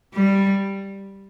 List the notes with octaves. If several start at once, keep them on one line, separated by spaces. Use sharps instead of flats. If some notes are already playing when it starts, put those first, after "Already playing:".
G3